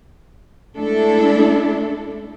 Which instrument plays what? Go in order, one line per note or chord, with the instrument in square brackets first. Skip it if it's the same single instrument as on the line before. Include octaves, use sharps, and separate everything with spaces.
[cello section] G#3 A3 D4 E4 A4